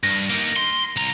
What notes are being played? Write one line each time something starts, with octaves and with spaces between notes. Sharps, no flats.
G2 A#6
A#3 D#4
C6
C2 A#5